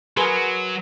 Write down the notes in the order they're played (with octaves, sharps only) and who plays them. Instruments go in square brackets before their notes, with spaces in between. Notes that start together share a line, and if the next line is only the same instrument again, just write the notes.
[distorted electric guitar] F#3 [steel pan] G#4 A#4 G#5 [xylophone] B4 B5 C6